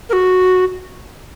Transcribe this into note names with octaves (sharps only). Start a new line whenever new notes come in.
A#4
F#4